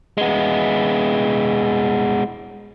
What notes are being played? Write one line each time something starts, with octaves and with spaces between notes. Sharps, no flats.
G#3 B3